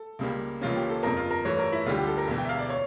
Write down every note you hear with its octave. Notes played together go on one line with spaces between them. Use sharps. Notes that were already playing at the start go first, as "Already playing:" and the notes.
Already playing: A4
C#2 C#3 G3 A#3
C#2 C#3 E3 A#3 C#4 F4
G4
A4
G1 F2 C#3 A#4
F4
A#4
G2 E3 A3 C#5
A#4
E4
D2 D3 G3 F4
G4
A4
A#4
E1 E2 E3
G5
E5
F5
D5
C#5